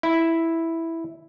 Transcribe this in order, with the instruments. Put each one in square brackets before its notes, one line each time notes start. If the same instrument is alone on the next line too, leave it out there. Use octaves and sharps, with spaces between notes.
[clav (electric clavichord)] E4